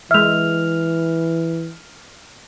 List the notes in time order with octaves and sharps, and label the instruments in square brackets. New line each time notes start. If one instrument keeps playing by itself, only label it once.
[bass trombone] E3 [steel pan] G#3 E5 [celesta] F6 F7